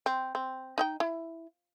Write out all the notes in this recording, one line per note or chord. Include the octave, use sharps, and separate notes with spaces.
C4
C4
D#4 E5 G5
E4